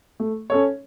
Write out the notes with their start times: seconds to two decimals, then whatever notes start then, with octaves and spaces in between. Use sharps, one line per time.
0.20 A3
0.50 C#4 A4 C#5